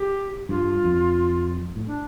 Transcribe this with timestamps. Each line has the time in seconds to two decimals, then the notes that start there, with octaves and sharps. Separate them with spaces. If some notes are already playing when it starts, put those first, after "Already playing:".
Already playing: G4
0.49 G2 F4
0.84 F2
1.76 A2
1.87 D4